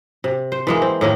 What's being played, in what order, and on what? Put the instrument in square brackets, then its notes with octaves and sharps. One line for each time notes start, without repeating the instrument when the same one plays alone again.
[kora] C3
C5
E3 G#3 A#3
C4
A2 D#3 A#3